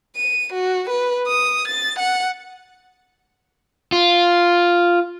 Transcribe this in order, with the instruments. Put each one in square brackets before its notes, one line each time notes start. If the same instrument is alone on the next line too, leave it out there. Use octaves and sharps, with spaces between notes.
[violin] D#7
F#4
B4
D#6
A6
F#5
[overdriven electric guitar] F4